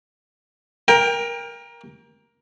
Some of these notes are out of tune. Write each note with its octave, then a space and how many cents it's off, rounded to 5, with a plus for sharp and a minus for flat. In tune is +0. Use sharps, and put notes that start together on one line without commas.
A#4 +15 G5 +35